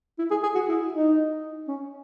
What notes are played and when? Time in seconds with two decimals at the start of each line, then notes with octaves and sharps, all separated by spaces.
0.18 E4
0.31 G#4
0.43 G#4
0.55 F#4
0.68 E4
0.92 D#4
1.68 C#4